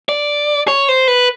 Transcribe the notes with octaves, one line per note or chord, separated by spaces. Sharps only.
D5
C#5
C5
B4